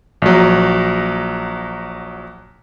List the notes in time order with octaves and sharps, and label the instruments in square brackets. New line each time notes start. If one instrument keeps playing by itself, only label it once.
[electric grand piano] A#1 F#3